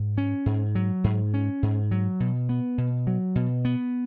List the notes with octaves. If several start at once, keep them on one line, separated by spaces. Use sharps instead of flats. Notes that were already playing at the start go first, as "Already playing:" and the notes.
Already playing: G#2
C#4
G#2
F#3
G#2
C#4
G#2
F#3
B2
B3
B2
F#3
B2
B3